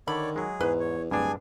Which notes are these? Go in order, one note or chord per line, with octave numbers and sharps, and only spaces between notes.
D3 D#3 C#5 D5 B5
F#3 G#3 G#4
E2 G#2 B4
C#5
D1 G2 D4 G#4 G#5